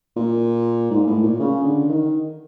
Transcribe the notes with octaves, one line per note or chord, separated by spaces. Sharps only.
A#2
G#2
A2
A#2
C#3
D3
D#3